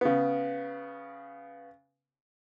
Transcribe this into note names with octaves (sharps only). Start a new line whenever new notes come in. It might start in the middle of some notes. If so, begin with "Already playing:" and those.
C#3 B3